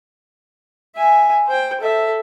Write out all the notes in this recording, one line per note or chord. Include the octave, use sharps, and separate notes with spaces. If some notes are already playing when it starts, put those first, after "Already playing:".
E5 G#5
C5 G5
A4 E5